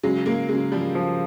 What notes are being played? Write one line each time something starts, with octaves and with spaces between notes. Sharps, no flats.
C#3 F#3 G#3
G#3 A#3
C#3 F#3 G#3
F3 G3
F3